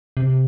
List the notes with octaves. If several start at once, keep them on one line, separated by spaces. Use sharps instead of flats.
C3